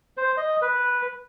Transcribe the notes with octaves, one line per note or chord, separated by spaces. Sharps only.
C5
D#5
B4